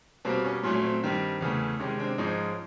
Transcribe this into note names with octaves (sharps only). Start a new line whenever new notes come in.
B2 G3 A#3 C4
C#4
A#2 F#3 A3 C#4
C#4
C4
G2 D#3 G3
E2 C#3 E3 A3
C3 D#3 G#3 C#4
C4 D4
G#2 F3 G#3 C#4 D#4